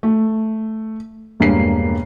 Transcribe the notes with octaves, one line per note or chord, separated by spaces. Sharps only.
A3
E1 G2 A#3 C7